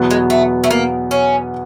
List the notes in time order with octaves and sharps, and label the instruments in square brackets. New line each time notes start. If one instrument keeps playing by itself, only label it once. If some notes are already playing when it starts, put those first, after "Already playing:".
Already playing: [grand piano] E2 B2 F#3 B3
[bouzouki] G#3
A3
A3
A#3
C#4